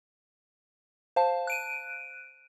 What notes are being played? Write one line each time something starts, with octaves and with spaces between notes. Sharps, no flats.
C5 F5 A5
F#6 D7 D#7